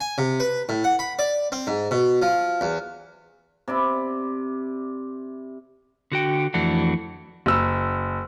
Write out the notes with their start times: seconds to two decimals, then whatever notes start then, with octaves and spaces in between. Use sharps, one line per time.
0.01 G#5
0.18 C3
0.40 B4
0.69 A2
0.84 F#5
0.99 B5
1.19 D5
1.52 C4
1.67 G#2
1.91 B2
2.22 F3
2.61 E2
3.68 C3 D5 B5
6.12 D3 F#4 G5
6.54 F2 E3 A3 D4 F#4
7.46 F#1 E6